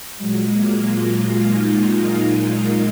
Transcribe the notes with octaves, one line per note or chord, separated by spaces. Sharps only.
A#2 F#3 G#3
A#3
F4
D#4